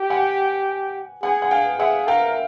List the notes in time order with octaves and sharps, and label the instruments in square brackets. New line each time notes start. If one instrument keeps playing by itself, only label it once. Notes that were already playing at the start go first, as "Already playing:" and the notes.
Already playing: [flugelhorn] G4
[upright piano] F#5 G#5
[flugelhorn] G#4 [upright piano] F#5 G#5
[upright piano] F#5
F5 G5
[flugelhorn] G#4 [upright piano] E5 F#5
[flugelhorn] A#4 [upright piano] F5 G5